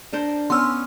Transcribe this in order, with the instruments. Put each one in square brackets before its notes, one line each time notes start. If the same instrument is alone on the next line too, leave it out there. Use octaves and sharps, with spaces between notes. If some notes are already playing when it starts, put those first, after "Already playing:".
[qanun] D4 A#4 C5
[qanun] B3 C#4 [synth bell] C6 E6 F6